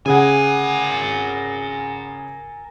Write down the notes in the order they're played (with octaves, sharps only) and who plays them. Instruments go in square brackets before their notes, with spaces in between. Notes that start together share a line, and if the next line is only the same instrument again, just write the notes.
[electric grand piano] C#3 G#4 F#5 [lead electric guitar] A#4 G#5